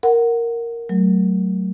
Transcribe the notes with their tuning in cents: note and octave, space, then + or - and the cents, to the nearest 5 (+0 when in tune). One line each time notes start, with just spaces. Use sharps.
A#4 +0 F#5 +0
F#3 +20 A3 +0